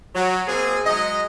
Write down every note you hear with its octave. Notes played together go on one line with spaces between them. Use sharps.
F#3
B2 A#3 C4 G#4
F#3 G#3 D#5